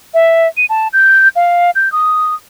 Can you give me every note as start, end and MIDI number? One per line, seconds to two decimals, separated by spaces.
0.14 0.47 76
0.57 0.66 99
0.70 0.88 81
0.93 1.28 91
1.36 1.71 77
1.75 1.91 91
1.92 2.34 87